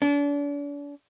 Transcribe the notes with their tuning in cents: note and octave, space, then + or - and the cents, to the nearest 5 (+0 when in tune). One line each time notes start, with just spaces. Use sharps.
D4 -40